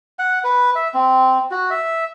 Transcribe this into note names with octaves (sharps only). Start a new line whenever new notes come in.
F#5
B4
E5
C4
F#4
E5